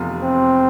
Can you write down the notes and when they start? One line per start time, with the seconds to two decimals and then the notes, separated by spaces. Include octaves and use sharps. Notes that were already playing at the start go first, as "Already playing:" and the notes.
Already playing: F1 E2 C3 F3
0.22 C4